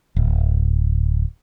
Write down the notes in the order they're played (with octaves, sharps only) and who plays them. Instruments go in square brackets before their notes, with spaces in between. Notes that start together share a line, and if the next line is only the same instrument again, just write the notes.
[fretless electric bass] D1